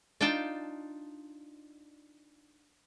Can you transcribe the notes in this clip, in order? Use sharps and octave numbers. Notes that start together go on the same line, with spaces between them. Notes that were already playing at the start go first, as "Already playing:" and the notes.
D4 D#4 F4 G5 A5